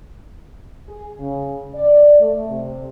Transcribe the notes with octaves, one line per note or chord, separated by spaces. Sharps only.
G#4
C#3
D5
A3
C3